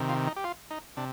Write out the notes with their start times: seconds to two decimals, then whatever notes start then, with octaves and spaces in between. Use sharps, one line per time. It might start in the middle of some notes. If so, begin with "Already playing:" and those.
Already playing: C3 D#3
0.09 F4
0.27 D#4
0.36 G4
0.44 F4
0.71 D#4
0.97 C3 D4